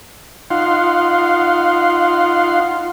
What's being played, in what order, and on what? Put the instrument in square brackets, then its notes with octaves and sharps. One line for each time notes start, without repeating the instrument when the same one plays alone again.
[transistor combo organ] D#4 F4 F5 F#5 C6